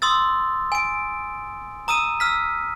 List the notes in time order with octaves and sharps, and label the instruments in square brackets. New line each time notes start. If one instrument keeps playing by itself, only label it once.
[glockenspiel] C6 D#6 E6 A6
G#5 D7
A#5 D#6 E6 D#7
E6 F6 B6